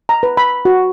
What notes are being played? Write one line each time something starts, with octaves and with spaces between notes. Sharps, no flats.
A#5
B4
B5
F#4